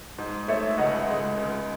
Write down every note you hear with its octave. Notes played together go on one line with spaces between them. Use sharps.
G#2
A3 C#5 E5
C#2 D#5 F#5
G#3
C#2